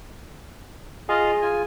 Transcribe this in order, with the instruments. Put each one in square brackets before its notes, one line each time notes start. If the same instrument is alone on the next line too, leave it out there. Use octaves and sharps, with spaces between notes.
[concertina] F4 D#5 F5 [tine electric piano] G#4
[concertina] F4 G#5